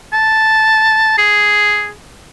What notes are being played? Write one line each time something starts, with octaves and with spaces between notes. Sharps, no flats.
A5
G#4